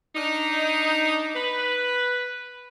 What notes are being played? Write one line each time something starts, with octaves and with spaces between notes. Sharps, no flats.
D4 D#4
B4